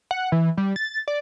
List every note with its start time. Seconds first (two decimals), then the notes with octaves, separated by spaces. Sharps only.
0.11 F#5
0.32 E3
0.57 G3
0.76 A6
1.08 D5